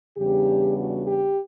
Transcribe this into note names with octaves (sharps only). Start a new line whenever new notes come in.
E2 C#3 G3 B3 D4 G4
F#4
G4